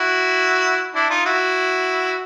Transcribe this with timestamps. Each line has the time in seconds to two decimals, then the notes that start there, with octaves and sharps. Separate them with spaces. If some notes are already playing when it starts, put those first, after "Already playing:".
Already playing: E4 F#4
0.95 D4 E4
1.10 D#4 F4
1.25 E4 F#4